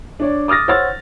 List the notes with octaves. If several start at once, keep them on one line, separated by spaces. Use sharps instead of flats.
D4 C#5 D5
D6 D#6 F6 A6 A#6
C5 C#5 F#5 E6 F6 A6